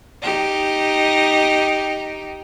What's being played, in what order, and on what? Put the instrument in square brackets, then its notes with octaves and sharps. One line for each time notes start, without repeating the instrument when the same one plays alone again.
[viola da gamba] D#4 G4